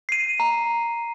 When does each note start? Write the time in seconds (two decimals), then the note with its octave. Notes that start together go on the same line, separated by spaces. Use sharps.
0.09 C7 D#7
0.40 A#5